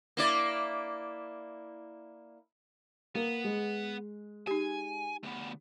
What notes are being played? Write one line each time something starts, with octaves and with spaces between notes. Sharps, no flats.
A#3 E4 D5
A#3 B3
G#3
D#4 G4 G#5
D2 B3